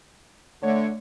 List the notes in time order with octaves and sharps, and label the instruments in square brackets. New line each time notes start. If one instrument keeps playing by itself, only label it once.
[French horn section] D3 C#5 [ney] A3